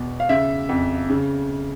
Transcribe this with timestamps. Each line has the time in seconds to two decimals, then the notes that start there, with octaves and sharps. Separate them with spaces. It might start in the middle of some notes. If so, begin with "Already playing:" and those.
Already playing: E2 B2
0.20 F5
0.29 C#3 E5
0.69 F2
1.10 C#3